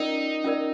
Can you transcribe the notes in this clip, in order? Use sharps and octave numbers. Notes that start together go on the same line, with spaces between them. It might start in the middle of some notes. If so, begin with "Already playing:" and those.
Already playing: C#4 D#4 F4 A#4 D5
C#4 F4 A#4 D5